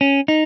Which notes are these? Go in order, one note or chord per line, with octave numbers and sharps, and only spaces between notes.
C#4
D#4